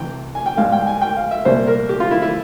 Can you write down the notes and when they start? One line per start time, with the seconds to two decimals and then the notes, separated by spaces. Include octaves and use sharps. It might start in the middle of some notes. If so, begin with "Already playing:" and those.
Already playing: C2 C3 E3 G5
0.35 G#5
0.46 G5
0.57 G#2 G3 F5
0.72 G5
0.87 G#5
1.02 G5
1.17 F5
1.31 E5
1.45 C2 A#2 G3 C5
1.67 A#4
1.89 G4
2.00 F4
2.11 E4
2.22 E4